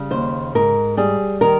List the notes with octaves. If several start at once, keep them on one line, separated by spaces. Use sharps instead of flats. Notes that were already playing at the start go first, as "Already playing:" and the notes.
Already playing: C#3 G3
D#2 C5
G#2 A#4
G3 G#4
D#3 A#4